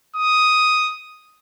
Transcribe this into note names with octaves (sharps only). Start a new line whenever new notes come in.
D#6